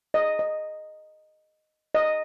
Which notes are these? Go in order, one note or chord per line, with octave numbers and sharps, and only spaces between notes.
D#5
D#5
D#5